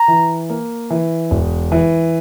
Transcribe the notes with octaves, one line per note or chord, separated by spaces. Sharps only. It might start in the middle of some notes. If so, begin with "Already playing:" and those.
Already playing: A#5
E3
A#3
E3
E1
E3